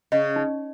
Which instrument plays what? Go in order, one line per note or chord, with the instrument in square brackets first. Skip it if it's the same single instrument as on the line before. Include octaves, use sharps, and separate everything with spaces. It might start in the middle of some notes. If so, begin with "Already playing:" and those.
[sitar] C#3 [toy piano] D#5
[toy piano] D#4